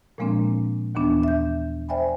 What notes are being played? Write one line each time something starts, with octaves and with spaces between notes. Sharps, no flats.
A#2 F3 G#3 A#3 C4 D4
D#2 E3 B3 D4
E5 G6
C5 D5 E5 G5 G#5 B5